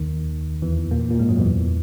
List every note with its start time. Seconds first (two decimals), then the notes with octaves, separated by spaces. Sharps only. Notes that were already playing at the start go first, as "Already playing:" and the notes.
Already playing: D#2 D#3
0.62 E2 E3
0.91 A#2 A#3
1.10 A#2 A#3
1.20 G#2 G#3
1.29 F#2 F#3
1.39 E2 E3